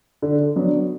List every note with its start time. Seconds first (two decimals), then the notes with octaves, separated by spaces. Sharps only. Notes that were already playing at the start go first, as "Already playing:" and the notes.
0.22 D3
0.56 F#3 B3 D4